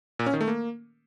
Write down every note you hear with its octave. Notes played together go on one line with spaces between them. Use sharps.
A#2
C#4
D#3
A3
A#3